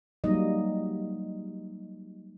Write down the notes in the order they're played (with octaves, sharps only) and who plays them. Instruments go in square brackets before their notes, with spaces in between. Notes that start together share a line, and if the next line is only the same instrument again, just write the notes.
[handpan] F#3 G3 A#3 D#4 D#5